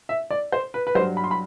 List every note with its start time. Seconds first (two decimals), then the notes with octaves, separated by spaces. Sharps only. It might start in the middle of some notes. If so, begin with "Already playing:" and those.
0.09 E5
0.31 D5
0.52 C5
0.74 B4
0.87 B4
0.95 F#3 C5
1.00 G2
1.17 B5
1.24 C6
1.31 B5